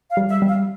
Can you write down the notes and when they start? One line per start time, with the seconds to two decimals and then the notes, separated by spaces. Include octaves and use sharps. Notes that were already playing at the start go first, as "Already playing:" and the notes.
0.10 F5
0.17 G3
0.28 E5
0.42 G3
0.47 F5